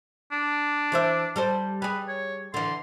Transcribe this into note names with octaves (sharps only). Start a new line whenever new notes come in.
D4
E3 C5 E5
G3 A4 C5
G3 G#4 B4
C#5
D3 E3 C6